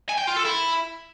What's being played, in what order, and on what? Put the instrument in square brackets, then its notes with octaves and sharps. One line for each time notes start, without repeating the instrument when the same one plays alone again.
[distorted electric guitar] G#5
G5
F4
A4
E4